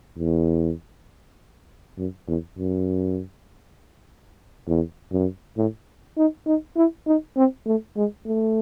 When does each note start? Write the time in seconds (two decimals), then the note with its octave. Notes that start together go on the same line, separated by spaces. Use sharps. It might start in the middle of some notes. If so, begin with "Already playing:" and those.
0.18 E2
1.98 F#2
2.28 E2
2.58 F#2
4.67 E2
5.12 F#2
5.57 A2
6.17 D#4
6.47 D#4
6.76 E4
7.06 D#4
7.36 C4
7.66 A3
7.96 G#3
8.26 A3